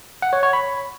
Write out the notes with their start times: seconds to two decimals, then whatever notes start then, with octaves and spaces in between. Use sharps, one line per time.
0.22 F#5
0.33 C#5
0.43 C#5
0.53 B5